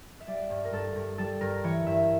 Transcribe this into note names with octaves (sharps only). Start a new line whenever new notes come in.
E5
G3 D5
G2
A#4
G2 A4
G2
G3 A4
G2 A#4
E3 C#5
G2 E5